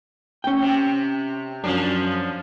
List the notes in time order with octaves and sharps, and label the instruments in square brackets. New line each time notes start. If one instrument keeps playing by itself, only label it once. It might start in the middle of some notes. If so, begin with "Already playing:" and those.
[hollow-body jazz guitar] C#4 G5
[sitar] C3
[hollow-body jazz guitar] F#2 [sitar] F3 C#4 D4